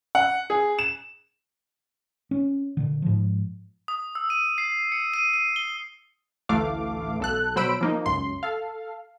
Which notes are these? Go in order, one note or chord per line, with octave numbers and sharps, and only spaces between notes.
F#5
G#4
E7
C#4
A#2 D3
G#2 F3
D#6
E6
D#7
C7
C#7
D#7
D#7
G7
A1 D2 E3 A3 F5 D6
B1 A4 F#6
B2 F#3 C5 B5 E6 D7
F3 A#3 D#4
C#2 F#2 C6
A4 F5